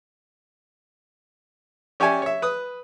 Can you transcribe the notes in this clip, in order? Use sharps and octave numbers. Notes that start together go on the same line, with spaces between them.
C#4 G4 C#5 D5 E5 G#5
C#5 E5
B4 D#6